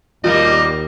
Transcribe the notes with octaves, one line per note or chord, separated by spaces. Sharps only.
D#2 B2 G3 A#3 F4 D#5